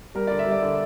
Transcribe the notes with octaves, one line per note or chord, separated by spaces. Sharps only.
G3 A#4
D5
D3
E5
G3
D5
D3 D5